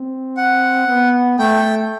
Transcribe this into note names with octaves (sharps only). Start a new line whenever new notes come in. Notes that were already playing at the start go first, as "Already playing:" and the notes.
Already playing: C4
F#5
B3
A3 G5